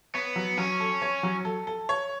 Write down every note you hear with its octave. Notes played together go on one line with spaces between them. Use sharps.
B3 C#5
F#3
F#3 C#4
A4
C#5
F#3
A4
A4
C#5